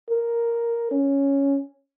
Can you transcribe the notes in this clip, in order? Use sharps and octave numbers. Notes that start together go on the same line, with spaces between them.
A#4
C#4